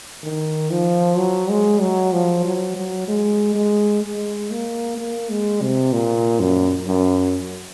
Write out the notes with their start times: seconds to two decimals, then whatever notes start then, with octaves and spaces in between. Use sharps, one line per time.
0.23 D#3
0.70 F3
1.18 F#3
1.50 G#3
1.81 F#3
2.12 F3
2.44 F#3
2.76 F#3
3.08 G#3
3.55 G#3
4.03 G#3
4.50 A#3
4.98 A#3
5.29 G#3
5.61 C3
5.92 A#2
6.40 F#2
6.87 F#2